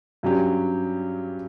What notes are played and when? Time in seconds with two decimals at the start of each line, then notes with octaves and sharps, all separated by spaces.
0.23 G2 F#3 C#4 G4